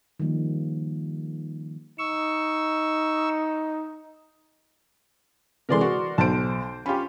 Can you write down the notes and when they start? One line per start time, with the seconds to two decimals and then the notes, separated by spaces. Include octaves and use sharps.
0.20 D#3 F3 G3 A#3
1.99 D#4 C#6 E6
5.69 C3 E3 G#3 A#4 D5 C6
5.81 F#4
6.18 B1 C5 A5 D7
6.86 C#4 F4 G4 B5